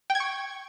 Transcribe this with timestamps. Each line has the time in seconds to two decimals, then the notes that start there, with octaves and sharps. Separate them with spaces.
0.10 G5
0.15 G#6
0.20 C#6